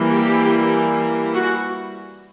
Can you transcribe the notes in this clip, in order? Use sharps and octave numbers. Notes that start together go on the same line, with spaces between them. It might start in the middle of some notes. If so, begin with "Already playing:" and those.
Already playing: E3 G3 A#3
G4
F#4